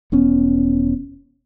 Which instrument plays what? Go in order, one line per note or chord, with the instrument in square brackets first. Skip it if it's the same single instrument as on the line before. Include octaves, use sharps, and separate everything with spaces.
[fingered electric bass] E1 B3 C#4